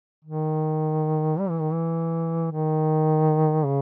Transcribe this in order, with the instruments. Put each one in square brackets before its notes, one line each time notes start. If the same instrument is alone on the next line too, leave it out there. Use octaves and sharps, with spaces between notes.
[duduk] D#3
G3
E3
D#3
E3
D#3
C#3